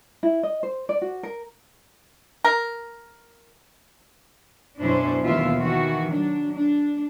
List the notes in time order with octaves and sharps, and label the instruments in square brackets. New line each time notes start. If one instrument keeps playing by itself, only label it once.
[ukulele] E4
D#5
C5
D5
F#4
A#4
[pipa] A#4
[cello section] F#2 B2 C#4 D4 E4 C5
D#2 B2 E3 F4 E5
D#3 E3 F#4
F#3 D4
D4